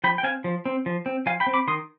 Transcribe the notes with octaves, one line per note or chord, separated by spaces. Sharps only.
F3 G5 B5
G5
C4 F5 G#5
F3
C4
F3
C4
F3 F5 G#5
G5 B5
C4
B5 D6
D#3 C6 D#6